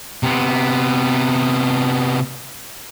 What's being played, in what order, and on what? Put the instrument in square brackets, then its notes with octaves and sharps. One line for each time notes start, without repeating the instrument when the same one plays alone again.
[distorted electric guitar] C3 B3